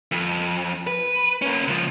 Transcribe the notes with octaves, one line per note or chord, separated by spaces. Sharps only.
F2
B4
A#3 C#4
C#2 F3